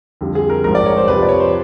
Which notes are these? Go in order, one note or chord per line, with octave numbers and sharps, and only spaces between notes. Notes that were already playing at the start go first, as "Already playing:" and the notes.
F2 D3 G3
G#4
A#4
A#1 G#2 F3 A#4
D5
C#5
C5
F2 C3 F3 B4
D5
C#5
C5